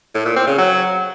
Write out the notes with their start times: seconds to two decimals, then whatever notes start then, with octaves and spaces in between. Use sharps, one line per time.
0.15 A2
0.25 A#2
0.36 C4
0.47 C#3
0.58 F#3